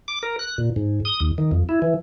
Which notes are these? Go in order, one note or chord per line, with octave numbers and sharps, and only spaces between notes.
D6
A#4
F#6
A#2
G#2
D#6
D#2
D#3
F2
E4
E3